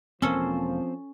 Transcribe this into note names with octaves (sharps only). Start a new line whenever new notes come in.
E1 F3 A#3 C4 C#4 A4 C5